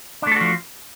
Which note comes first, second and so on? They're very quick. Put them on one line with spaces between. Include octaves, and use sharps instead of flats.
D4 A3 A4 F#4 F3